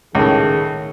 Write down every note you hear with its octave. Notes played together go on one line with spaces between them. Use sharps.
C#2 A2 D#3 G#4